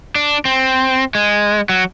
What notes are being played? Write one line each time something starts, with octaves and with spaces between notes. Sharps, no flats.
D4
C4
G#3
F#3